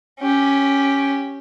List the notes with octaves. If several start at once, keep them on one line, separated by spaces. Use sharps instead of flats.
C#4 G4